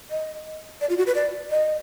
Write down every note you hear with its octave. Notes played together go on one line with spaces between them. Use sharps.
D#5
D5
F4
F#4
B4
D5
D#5